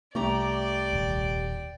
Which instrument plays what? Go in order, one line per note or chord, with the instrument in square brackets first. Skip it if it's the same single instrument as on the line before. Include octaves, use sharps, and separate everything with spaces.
[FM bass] C2 [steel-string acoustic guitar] A3 G4 A#5 [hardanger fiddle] D5 G5
[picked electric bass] D#1